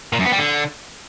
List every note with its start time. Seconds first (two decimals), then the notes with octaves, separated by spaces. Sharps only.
0.13 A#2
0.19 F#2
0.26 B3
0.32 G3
0.39 D3